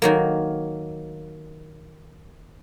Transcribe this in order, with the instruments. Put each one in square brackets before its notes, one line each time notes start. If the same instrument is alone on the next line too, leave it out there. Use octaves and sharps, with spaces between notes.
[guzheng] D#3 F#3 A#3